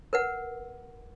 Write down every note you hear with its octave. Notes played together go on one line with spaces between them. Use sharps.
A#4 B4 F#5